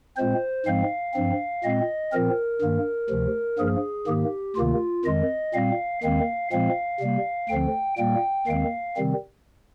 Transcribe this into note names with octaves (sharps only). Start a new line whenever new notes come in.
A#2 G#3 C4 C5
G#2 F3 G#3 C4 F5
G2 F3 C4
A#2 G#3 C4 D#5
A#2 F3 C4 A#4
G2 D#3 A#3
D2 C3 F3
G2 F3 A#3 G#4
G#2 D#3 A#3 G4
D2 C3 D#3 A#3 F4
F2 D#3 G#3 D#5
A#2 G3 C4 F5
D#2 D#3 G#3 C4 F5
A#2 F3 G#3 C4 F5
C3 G3 A#3
D2 D3 F3 C4 G5
A#2 G3 A#3 G5
D#2 D#3 G#3 C4 F5
C3 D#3 G3 C4